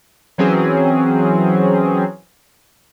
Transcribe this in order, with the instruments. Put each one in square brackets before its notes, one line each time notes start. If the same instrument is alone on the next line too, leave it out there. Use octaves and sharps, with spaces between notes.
[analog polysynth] E3 F#3 C4 C#4 G#4